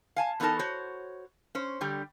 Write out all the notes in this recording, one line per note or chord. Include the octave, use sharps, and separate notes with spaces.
F5 G#5 A5
E2 B3 D#4 A4 A#4 A5
F#4 C5 C#5
C#4 C5
D3 G3 G4